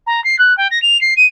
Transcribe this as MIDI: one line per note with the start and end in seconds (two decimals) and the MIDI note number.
0.07 0.23 82
0.24 0.38 96
0.39 0.56 90
0.57 0.68 79
0.71 0.81 94
0.82 1.00 101
1.01 1.14 96
1.17 1.26 99